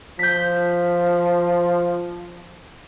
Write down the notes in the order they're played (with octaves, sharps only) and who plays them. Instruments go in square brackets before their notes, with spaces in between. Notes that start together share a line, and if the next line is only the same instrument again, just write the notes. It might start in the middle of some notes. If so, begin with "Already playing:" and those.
[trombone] F3 [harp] G6 B6